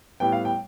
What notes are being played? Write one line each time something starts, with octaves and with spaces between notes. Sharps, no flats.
A2 G3 B3 G5
F5
G5